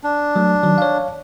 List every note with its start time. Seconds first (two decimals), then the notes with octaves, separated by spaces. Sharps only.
0.04 D4
0.36 F#3 A3
0.63 D#3 F#3
0.78 C#5 F5